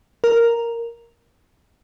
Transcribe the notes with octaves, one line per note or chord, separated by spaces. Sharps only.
A#4